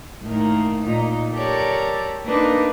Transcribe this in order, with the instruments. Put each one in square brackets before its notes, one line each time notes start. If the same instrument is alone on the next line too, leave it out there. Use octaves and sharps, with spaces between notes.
[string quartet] A2 D#3 A#3
A#2 D#4
G4 A4 A#4 C#5 D5
A#3 D4 D#4 A#4 B4